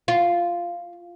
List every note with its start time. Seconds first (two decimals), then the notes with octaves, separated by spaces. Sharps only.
0.08 F4